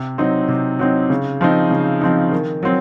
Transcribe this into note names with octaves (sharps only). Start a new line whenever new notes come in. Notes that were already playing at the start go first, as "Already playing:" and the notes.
Already playing: C3
F#3 C4 D#4
C3
F#3 C4 D#4
C#3
F3 C4 D#4
C#3
F3 C4 D#4
D#3
F#3 C4